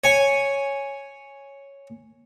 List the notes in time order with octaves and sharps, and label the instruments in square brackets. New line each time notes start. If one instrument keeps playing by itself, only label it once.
[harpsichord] C#5 G#5